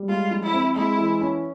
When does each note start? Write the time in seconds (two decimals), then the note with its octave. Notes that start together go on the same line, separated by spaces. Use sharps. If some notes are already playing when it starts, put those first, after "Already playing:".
Already playing: G3
0.08 G#3 F4
0.31 F3
0.43 E4
0.53 C4
0.75 G#3 E4
0.98 E3
1.21 C#4